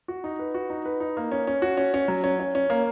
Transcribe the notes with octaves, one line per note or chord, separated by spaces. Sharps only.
F#4
D#4
B4
F#4
D#4
B4
D#4
A#3
C#4
C#4
F#4
C#4
C#4
F#3
C#4
C#4
C#4
A#3